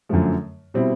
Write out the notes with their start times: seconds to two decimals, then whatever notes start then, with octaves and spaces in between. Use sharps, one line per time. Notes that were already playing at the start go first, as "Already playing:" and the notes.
0.09 F#2 D3 F3 A3
0.74 B2 G3 C4 E4